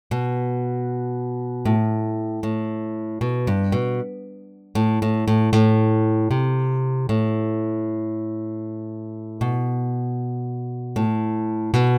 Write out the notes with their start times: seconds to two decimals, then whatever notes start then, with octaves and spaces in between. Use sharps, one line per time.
0.11 B2
1.65 A2
2.43 A2
3.21 B2
3.47 G2
3.72 B2
4.75 A2
5.02 A2
5.28 A2
5.53 A2
6.31 C3
7.09 A2
9.41 B2
10.96 A2
11.74 B2